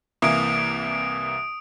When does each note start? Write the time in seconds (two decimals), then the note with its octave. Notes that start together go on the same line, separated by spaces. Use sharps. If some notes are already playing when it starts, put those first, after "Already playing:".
0.22 C2 E3 A#3 D#6 D7